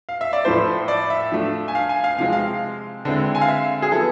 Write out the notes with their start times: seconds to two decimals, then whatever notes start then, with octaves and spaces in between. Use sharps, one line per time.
0.09 F5
0.21 E5
0.33 D5
0.45 A2 F3 A3 E4 C5
0.88 D5
1.10 E5
1.32 F3 A3 D4
1.68 G#5
1.75 F5
1.89 G#5
2.04 F5
2.18 C3 F3 G#3 C4 F5
2.32 F5
3.05 D3 G#3 C4 E4
3.35 G#5
3.41 F5
3.48 E5
3.82 G#4
3.92 F3 B3 E4 A4